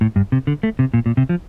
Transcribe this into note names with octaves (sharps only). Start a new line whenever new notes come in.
A2
G2
C3
D3
A3
C3
A#2
A#2
C3
F3